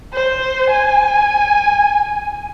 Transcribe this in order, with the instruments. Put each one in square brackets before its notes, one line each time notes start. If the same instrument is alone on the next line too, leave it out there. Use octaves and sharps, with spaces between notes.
[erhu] C5
G#5